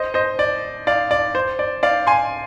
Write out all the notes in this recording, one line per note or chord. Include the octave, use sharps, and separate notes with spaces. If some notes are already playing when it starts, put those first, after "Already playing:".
Already playing: C5 D#5
C5 D#5
D5
D5 F5
D5
C5
D5
D5 F5
G#5 C6